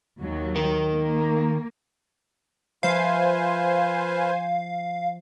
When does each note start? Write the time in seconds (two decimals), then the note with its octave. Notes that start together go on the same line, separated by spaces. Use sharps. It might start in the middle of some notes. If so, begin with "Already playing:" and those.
0.20 D#2 F#3
0.55 D#3 D#4 A#4
0.93 A#3
2.83 F3 F4 B4 C5 E5 F5 G#5